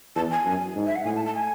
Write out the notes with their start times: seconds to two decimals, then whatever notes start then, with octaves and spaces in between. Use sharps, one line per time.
0.15 E2 A5
0.31 G#5
0.45 F#2
0.75 G#2
0.86 E5
0.95 F#5
1.05 A2 G#5
1.15 A5
1.25 A5
1.35 G#5